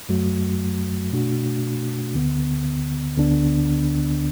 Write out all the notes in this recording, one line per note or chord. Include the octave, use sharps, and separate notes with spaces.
F#2 F#3 A3 F#4
B2 A3 D4 F#4
D2 D3 B3
D2 D3 B3 D4